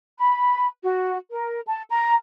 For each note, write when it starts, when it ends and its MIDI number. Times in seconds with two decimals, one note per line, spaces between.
0.19 0.68 83
0.84 1.17 66
1.31 1.61 70
1.67 1.82 81
1.89 2.14 82